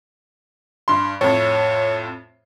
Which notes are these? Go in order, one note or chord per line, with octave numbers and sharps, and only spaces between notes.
G2 C6
F2 A2 C#5